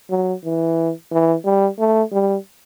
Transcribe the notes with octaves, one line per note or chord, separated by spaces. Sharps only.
F#3
E3
E3
G3
A3
G3